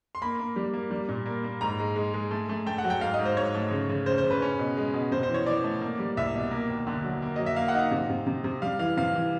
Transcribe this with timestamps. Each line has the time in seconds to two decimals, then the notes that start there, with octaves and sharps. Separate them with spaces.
0.15 C6
0.22 A#3 B5
0.39 A#3
0.56 G3
0.74 A#3
0.91 G3
1.09 A#2
1.26 A#3
1.44 A#3
1.61 G#2 A#5
1.79 G#3
1.96 G#3
2.14 G#3
2.31 A3
2.49 A3
2.66 A3 G5
2.78 F#5
2.85 F#3
2.90 G5
3.01 G#2 F5
3.14 D#5
3.19 G#2
3.25 C5
3.37 G#2 C#5
3.54 A3
3.71 C#3
3.89 C#3
4.06 C#3 C5
4.18 C5
4.24 C#3
4.30 B4
4.42 C#4
4.59 B2
4.77 G#3
4.94 B2
5.11 C3 C5
5.23 C5
5.29 E3
5.34 C#5
5.46 E3 D5
5.64 A3
5.81 A#3
5.99 G3
6.17 C2 E5
6.35 B2
6.51 A#3
6.69 D#2
6.87 D3
7.04 F#3
7.22 A#3
7.36 F#3 D#5
7.46 E5
7.56 A#3 F5
7.68 F#5
7.74 D#4
7.80 F5
7.91 C3
8.10 C3
8.27 C3
8.44 C3
8.62 G3 F5
8.79 E3 F5
8.97 C3 F5
9.15 E3